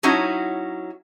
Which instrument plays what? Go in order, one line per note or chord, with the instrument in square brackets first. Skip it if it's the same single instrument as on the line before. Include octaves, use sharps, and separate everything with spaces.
[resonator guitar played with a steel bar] F#3 C#4 D#4 E4 F#4